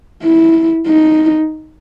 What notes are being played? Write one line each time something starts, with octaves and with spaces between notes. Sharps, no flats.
E4
D#4